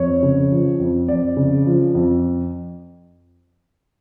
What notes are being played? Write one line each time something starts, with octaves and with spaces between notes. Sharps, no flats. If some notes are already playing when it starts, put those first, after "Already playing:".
Already playing: F2 C#5
C#3
F3
F2
F2 D5
C#3
F3
F2